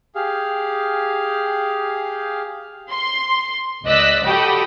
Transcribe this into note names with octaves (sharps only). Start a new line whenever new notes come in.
G4 G#4 F5
C6
C#2 D5 D#5 E6 F#6 B6
F#4 G4 A4 G5 B5 D#6